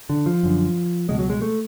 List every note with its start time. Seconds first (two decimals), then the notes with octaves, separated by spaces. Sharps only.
0.09 D3
0.26 F3
0.43 F#2 D3
1.09 C#2 B2 G#3
1.19 F#3
1.30 G#3
1.42 A3